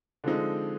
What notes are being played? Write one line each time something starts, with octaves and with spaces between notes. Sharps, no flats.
D3 F3 G#3 C4 D#4